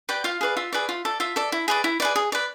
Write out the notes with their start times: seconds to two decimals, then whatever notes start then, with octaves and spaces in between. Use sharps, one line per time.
0.09 G4 B4 D5 G5
0.24 F4 F5
0.41 G#4 B4 D5
0.57 F4 E5
0.73 G#4 B4 D5
0.89 F4
1.05 A4 D5
1.20 F4 E5
1.36 A4 D5
1.52 E4
1.68 G#4 B4 D5
1.84 E4
2.00 G#4 B4 D5
2.16 G#4
2.32 B4 D5